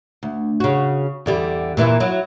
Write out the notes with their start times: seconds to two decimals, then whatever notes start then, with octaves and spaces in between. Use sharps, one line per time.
0.23 D2
0.60 C#3 F#4
1.26 E2 D3 G3
1.77 A#2 E3 E4
2.00 F#3 E4